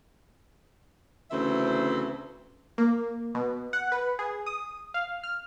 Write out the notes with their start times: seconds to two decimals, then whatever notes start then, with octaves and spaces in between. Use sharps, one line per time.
1.31 D2 C#3 E3 C4 C5 E5
2.78 A#3
3.35 B2
3.73 F#5
3.92 B4
4.19 G#4
4.46 D#6
4.94 F5
5.23 F6